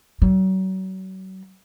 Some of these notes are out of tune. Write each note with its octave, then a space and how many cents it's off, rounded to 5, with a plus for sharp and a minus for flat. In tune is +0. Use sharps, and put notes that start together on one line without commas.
F#3 +35